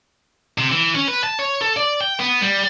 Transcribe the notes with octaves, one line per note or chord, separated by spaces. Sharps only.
C3
E3
C#4
B4
A5
C#5
A4
D5
G5
B3
G3